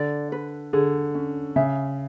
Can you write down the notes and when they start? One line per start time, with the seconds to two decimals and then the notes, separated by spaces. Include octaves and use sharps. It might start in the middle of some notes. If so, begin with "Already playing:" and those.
Already playing: D3 D5
0.32 B4
0.73 D3 G#4
1.15 C#4
1.56 C#3 E5